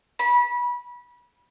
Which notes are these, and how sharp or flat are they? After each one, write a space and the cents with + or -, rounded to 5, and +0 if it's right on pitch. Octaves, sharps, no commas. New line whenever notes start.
B5 -25